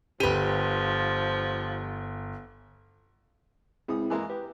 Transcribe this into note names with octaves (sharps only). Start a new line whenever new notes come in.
G1 F3 G4 B4 D#7
C#2 C4 E4 G#4 D#6
E3 G#3 A#3
G4 B4